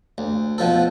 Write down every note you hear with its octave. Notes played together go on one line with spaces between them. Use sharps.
D2
B2 F3 A4